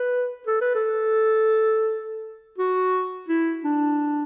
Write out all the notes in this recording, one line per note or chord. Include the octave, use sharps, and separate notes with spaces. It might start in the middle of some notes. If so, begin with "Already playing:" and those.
Already playing: B4
A4
B4
A4
F#4
E4
D4